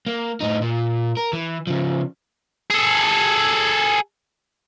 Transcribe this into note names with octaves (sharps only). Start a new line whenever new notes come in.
A#3
A2 D#4
A#2
A#4
E3
C#3 F3
G#4 A4